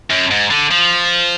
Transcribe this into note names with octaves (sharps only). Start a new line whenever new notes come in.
F#2
G#2
D3
F3